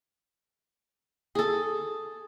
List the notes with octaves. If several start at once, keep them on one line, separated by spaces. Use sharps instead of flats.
G#4 A4